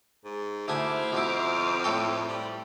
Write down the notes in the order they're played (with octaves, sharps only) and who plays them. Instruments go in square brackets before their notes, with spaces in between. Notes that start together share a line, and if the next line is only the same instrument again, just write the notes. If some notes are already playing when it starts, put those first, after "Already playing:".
[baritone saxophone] G#2
[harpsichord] D2 D4 G#5 [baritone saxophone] E4 [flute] C5 [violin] D6 F6
[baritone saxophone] F2 [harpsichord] B2 E4
[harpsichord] A2 A4 G5
[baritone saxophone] G3